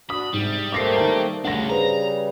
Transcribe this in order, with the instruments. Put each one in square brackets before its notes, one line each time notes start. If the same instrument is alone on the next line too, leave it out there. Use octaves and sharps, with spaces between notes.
[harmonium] D4 F#4 [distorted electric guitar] B5 [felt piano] D#6
[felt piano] G#2 [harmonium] C3 [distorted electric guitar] G3
[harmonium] A3 A#3 C4 [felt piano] D6 A#6 C7
[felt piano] D#3 G5 A5
[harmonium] C#3 G3 [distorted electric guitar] A3 D4 [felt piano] F#5 A#6
[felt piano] G#4 B4 C5 [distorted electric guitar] A#5